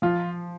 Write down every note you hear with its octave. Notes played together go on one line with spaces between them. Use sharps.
F3 F4